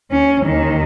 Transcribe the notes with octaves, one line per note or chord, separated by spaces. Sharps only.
D#2 C#4
D#2 D#3